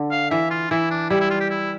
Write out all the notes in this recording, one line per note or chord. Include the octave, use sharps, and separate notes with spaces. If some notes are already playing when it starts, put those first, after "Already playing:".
Already playing: D3
F5
E3 E5
F4
E3 E4
D4
G3 E4
E4
F4
G4
E4